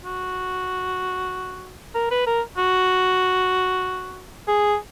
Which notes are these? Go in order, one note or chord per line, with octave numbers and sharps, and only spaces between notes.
F#4
A#4
B4
A#4
F#4
G#4